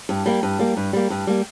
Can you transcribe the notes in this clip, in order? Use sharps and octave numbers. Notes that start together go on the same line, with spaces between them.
G2
G3 A#3
G2
G3 A#3
G2
G3 A#3
G2
G3 A#3